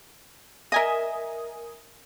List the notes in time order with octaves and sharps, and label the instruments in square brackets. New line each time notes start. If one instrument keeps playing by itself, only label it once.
[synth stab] A#4 G#5 D#6 [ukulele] D#5 E5